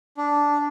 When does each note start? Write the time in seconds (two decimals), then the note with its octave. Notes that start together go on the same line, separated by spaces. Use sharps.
0.17 D4